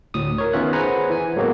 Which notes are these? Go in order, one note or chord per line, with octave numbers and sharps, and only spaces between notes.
D2 A2 D#6
A#4 C#5
D#3 B3 C#4 F4 E5 F#6
G#4 B4 C5 F#5 G#5 A#5
E3 G#5
A2 F#3 G#3 A#3 B3 F#4